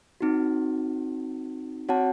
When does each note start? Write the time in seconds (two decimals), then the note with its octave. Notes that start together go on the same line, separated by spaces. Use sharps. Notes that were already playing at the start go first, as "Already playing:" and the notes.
0.21 C4 D#4 F#4
1.89 C4 F#4 C#5 F#5 A5